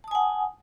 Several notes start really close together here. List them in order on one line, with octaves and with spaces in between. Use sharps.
A5 D#6 G#5 F#5